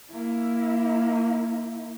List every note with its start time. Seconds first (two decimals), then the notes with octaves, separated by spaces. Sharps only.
0.12 A#3 E4